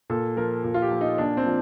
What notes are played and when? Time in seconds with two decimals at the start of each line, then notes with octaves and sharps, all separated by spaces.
0.10 A#2 A4
0.37 F3 A#4
0.64 A#2
0.74 F4
0.82 G4
0.91 F3
1.01 D#4
1.18 A#2 D4
1.37 C4
1.46 F3